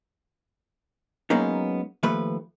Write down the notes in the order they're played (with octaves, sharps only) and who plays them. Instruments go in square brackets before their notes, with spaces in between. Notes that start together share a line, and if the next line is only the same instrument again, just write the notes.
[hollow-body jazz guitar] F#3 G#3 A#3 B3 C#4 D#4
D#2 F3 A3 B4